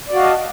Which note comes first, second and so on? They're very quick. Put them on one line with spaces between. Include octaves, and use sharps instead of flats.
D5 F#4 F5 D#5 A5